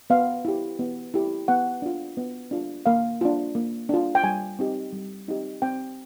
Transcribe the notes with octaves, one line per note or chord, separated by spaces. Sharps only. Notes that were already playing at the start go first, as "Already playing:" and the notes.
B3 F5
E4 G4
B3
E4 G4
B3 F#5
D4 F4
B3
D4 F4
A#3 F5
D4 F4
A#3
D4 F4
G5
G3 G#5
C4 D#4 G4
G3
C4 D#4 G4
C4 G5